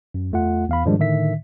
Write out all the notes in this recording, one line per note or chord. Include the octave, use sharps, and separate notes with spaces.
F#2
E2 A3 F4 F#5
E2 F5 B5
G#2 D#3 F3 G3 G#3 D4
A2 D3 D#3 E5 B6